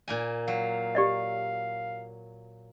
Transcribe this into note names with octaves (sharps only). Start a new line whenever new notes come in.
A#2 A#3 G#5
F#3 F5
G4 D5 D#5